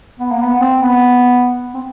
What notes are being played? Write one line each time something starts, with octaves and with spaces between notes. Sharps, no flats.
B3
A#3
B3
C4
B3
C4